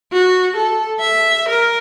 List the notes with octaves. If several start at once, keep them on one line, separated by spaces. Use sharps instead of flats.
F#4
A4
E5
A#4